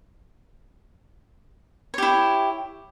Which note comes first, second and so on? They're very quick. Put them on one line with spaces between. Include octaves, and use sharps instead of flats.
C#5 G4 E4